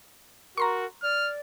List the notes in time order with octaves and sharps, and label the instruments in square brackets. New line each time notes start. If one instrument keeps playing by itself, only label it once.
[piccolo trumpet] F#4 [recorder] A#4 [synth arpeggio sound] A#5 C6 C#6
[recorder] D5 [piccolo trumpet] F6